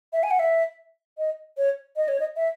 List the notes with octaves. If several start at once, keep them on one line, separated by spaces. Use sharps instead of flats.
E5
G#5
F#5
E5
D#5
C#5
D#5
C#5
D#5
E5